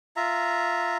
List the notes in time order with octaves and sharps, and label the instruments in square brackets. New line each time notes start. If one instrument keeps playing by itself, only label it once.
[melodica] F4 E5 A#5